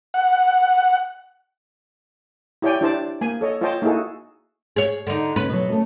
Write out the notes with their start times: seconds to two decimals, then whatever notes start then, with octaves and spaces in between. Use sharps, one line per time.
0.14 F#5
2.62 E4 G4 C#5 D5 G5 G#5
2.81 D4 E4 G4 C5 D5 A5
3.21 A#3 G#5
3.41 A4 C#5 D#5
3.61 F4 C5 C#5 D#5 G5 A5
3.82 A#3 D#4 E4 F#4 G#4 A4
4.76 G#4 C#5
5.07 D3 D#4
5.36 C#3 B4
5.49 B2 F#3
5.69 A3 C#4